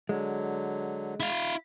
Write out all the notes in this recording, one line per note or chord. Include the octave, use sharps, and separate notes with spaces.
D3 F#3 G#3
E4 F5